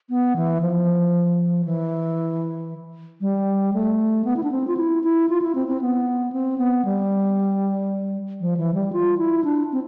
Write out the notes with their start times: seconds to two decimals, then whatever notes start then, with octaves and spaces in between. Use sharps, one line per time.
0.09 B3
0.36 E3
0.61 F3
1.65 E3
3.21 G3
3.74 A3
4.25 B3
4.37 E4
4.43 D4
4.51 C4
4.67 F4
4.77 E4
5.03 E4
5.29 F4
5.42 E4
5.55 C4
5.68 C4
5.81 B3
6.32 C4
6.58 B3
6.85 G3
8.41 F3
8.57 E3
8.74 G3
8.93 F4
9.18 E4
9.44 D4
9.72 C4